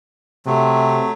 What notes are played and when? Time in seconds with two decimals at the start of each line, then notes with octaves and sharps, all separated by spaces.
0.46 C3 F#3 A3